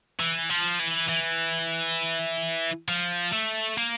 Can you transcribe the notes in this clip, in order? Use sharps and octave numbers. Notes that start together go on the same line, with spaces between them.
E3
F3
E3
E3
F3
A3
A#3